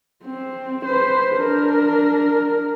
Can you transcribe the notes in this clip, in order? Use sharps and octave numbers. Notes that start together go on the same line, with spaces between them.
C4
B4 C5
D4 A#4